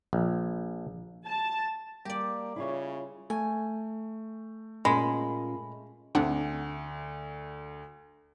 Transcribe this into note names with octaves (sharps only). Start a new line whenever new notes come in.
A#1
A5
G3 A#3 G4 D5
C#3 E4 F4 C#5
A3 G#5
A#2 G#3 C#4 A#4 B5
D2 C4 D4 F#5